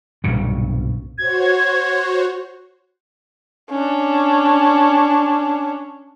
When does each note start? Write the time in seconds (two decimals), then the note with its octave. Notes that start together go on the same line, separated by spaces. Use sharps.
0.24 B1 G2 A#2 C#3
1.18 F#4 C5 C#5 G#6
3.70 C#4 D4